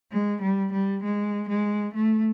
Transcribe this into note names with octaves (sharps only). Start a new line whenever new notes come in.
G#3
G3
G3
G#3
G#3
A3